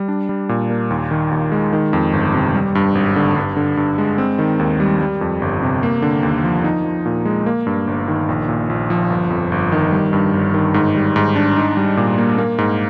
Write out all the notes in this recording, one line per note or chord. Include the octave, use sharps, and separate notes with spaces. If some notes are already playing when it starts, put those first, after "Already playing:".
Already playing: G3
D4
G3
A#2
A#3
D#2
D#3
D#2
G#3
D#3
F2
G1
C3
G3
G2
G#1
D3
G2
D3
G2
G#3
C4
D#3
D#2
G3
G3
F2
G1
C3
A#3
D3
D#2
F3
D#4
F3
A#2
G#3
A#3
G2
G1
D#3
A#1
A#2
A#1
F3
G1
F2
G1
D#3
G3
G2
G1
D#3
G#2
G3
G#2
D4
D#4
G3
A#2
A#3
A#3
G#2